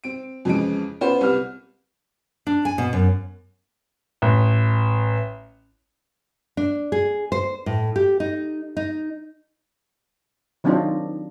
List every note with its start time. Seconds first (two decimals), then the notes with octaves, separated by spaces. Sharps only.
0.04 C4 D7
0.45 F2 C#3 E3 F3 G#3 D7
1.01 B3 C#4 F4 B4 C5
1.21 C2 C3 B4 F6
2.47 D4
2.65 G#5
2.78 B2
2.93 F#2
4.22 A1
6.57 D4
6.92 G#4
7.32 C5
7.66 A2
7.96 G4
8.20 D#4
8.77 D#4
10.64 D#3 F#3 C4 D4 D#4 F4